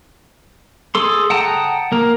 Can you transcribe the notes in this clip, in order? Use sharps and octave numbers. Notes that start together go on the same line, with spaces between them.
G#4 A4 C6
F#5 G5 A5 A#5 D#6
A#3 A#4